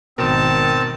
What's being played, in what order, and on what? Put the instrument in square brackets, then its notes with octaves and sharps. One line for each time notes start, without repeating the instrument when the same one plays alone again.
[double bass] G#1 D#3 [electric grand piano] B2 A#4 [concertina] C4 [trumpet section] D#4 A5